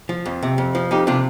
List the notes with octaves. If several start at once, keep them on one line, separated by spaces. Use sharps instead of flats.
F3
F2
C3
F2
F3
F2 D#4 G4
C3 D4 F4